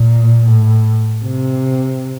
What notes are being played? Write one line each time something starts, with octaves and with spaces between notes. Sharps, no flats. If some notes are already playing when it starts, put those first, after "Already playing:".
Already playing: A#2
A2
C3